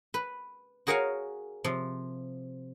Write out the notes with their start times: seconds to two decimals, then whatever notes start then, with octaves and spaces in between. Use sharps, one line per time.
0.14 B4
0.87 F#4 G#4 A#4 C#5 F5 G#5
1.64 C3 F3